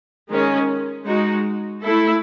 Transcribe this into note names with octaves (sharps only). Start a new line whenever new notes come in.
D#3 G#3 C#4
G#3 D#4 F#4
A3 E4 A4